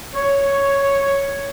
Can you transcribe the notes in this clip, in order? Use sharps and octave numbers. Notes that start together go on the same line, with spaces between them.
C#5